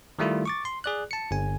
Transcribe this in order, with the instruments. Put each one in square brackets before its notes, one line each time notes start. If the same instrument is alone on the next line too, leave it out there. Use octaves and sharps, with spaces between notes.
[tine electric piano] D#3 G3 A3 E4 F4
C#6 D6 A6
C6
G#4 D5 F#6
A5 C#7
G1 G#5